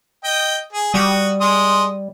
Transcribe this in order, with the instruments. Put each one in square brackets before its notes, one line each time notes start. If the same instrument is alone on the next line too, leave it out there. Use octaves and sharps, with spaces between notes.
[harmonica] D#5 G5
G#4
[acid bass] G3 [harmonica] F#4 D#6
[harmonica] G#3 C6 D#6